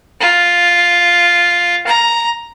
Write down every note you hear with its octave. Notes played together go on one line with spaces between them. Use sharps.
F4
A#5